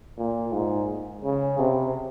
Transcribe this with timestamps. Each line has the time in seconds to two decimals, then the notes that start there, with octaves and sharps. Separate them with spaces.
0.18 A#2
0.52 G#2
1.23 C#3
1.59 C3